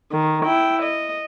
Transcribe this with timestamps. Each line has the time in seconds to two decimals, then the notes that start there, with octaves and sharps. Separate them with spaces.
0.12 D#3
0.46 E4 G5
0.83 D#5